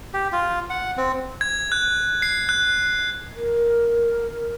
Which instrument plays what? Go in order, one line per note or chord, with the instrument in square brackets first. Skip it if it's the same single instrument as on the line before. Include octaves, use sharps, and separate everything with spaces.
[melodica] G4
F4
F#5
C4
[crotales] G#6
F#6
C7
F#6
[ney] A#4